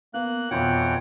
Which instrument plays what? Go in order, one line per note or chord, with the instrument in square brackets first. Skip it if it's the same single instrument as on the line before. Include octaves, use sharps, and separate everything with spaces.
[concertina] A#3 F#6 [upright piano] B3
[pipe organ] F2 E3 [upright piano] B2 F4 C6 [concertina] C#5 F#5 G5